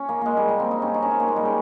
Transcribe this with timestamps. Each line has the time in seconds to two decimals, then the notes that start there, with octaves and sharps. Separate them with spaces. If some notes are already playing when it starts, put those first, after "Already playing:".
Already playing: C#4
0.09 A#3
0.21 G#3 A#3
0.37 G3
0.49 A#3
0.60 C4
0.71 D#4
0.82 C#4
0.94 D#4
1.02 C#4
1.11 C4
1.20 A#3
1.28 G#3
1.36 G3
1.45 C#4